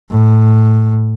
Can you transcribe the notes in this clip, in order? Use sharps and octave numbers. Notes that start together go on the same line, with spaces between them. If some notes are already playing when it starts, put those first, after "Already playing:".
A2